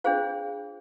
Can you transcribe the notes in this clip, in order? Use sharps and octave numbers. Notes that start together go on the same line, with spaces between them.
D4 F4 G#4 C5 F5